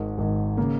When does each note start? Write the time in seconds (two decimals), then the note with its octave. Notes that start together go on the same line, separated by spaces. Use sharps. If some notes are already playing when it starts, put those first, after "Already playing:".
Already playing: G#1 G#2 D#3 G#3
0.18 G#1 G#2 D#3
0.57 C#3 A#3